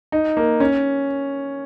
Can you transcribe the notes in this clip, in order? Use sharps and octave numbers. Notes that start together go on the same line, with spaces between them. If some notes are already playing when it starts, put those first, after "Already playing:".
D#4
A#3
C#4